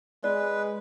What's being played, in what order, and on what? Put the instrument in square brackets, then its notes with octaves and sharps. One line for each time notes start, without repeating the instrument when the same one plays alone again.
[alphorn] G#3 [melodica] B4 [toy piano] D5